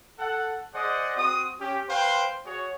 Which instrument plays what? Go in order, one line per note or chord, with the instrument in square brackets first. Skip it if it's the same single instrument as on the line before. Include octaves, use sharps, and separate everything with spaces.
[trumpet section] A4 F#5
G#4 C5 D5 D#5 F#5
C4 F#4 D#6
C#4 G4
B4 C5 F5 G5 C6
F#4 G#4 C#5